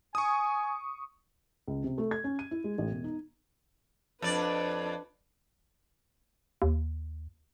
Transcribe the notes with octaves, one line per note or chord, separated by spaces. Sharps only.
G#5 C#6 D#6
C#2
C3
A3
G#6
C#4
D#7
E4
G#3
A1
E1
D#4
F2 D4 B4 D5
D#2